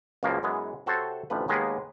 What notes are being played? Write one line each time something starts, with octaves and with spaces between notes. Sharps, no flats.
C#2 F#2 C#3 F3 A#3
F#2 E3 G#3 B3
C3 F#4 A4 C5 C#5 A5
A1 D2 C3 F3 B4
D#2 D#3 G#3 A#3 B3 B4